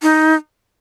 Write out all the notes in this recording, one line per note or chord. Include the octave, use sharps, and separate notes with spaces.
D#4